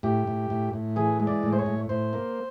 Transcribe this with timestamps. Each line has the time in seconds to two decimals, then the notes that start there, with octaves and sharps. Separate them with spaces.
0.03 A2 G4
0.27 A2
0.50 A2
0.73 A2
0.96 E3 G#4
1.20 G#3
1.27 D5
1.43 A2
1.53 C5
1.59 C#5
1.66 A2
1.89 A2 C5
2.13 A#3